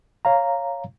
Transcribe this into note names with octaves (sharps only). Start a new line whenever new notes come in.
C#5 F5 A#5